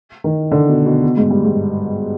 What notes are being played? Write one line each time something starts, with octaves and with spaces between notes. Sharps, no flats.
D#3
D3
B2
B2
B2
G#2
G2
G#2